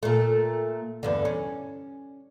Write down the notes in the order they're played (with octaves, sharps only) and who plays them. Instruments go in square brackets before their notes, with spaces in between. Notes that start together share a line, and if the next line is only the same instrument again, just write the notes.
[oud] A#2 A3
E2 G2 D3
C#4